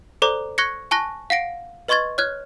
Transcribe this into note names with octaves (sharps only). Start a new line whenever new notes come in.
A4 C5 D5 A#5 D6
C#6 F#6 G#6 A#6 C#7
G#5 A5 C#6 F#6 A#6
F5 F#5 A#6 D7
B4 D#5 C6 C#6 G#6 A6
C#5 F6 F#6 G#6